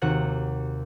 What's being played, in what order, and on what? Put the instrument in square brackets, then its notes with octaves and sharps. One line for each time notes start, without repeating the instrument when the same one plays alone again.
[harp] D#2 C3 F#4 F#5 F#6